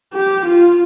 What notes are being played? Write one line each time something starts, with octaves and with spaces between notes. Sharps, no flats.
G4
F4